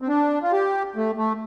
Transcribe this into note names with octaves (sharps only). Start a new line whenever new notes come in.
C4
D4
F4
G4
A3
A3